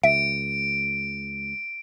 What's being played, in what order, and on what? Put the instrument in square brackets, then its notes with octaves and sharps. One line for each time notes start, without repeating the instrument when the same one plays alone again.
[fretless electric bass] C#2 [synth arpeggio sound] E5 [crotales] D7